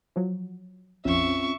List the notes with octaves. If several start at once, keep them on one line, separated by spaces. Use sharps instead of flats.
F3 F#3
A#1 F2 C4 C#4 F4 E5 C#6